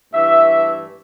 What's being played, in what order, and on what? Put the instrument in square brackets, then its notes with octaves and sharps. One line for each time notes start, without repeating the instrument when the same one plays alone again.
[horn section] G2 E3 A3 E5